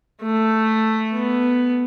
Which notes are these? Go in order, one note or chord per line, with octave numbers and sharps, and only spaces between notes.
A3
B3